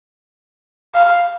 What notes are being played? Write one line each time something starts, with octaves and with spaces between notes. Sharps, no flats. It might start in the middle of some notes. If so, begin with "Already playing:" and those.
F5